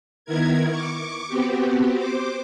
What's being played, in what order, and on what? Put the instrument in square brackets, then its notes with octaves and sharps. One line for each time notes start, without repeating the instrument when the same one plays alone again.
[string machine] D#3 B3 E4 A#4 G#6
C#6 D6
B3 C4 F#4 G4
C5 D6